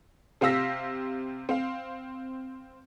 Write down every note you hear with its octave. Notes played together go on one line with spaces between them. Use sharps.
C3 C4 F5 E6 A#6 B6
C4 F5